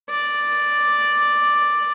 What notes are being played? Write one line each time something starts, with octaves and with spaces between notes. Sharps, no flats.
D5